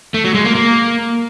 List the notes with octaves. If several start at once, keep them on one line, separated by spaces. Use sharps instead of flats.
A3
F#3
G#3
A#3
A#3